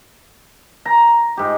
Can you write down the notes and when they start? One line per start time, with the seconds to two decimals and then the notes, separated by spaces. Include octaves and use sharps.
0.85 A#5
1.37 G#2 G4